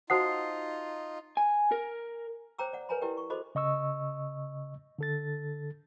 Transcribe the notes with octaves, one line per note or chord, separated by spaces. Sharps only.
D#4 F4 F#4 C5 F#5 A5 D#6 C7
G#5
A#4
C5 C#5 G5 A#5 D6 E6
D5 F#5
A#4 B4 C#5 G#5 A#5 B5
E4 G4 A#4 D5 G5
C#6
F#4 A4 C5 D#5 B5 D6
C#3 D#5 C#6 E6
D3 A4 A6